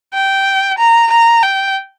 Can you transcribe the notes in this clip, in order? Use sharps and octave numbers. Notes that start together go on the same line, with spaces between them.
G5
A#5
A#5
G5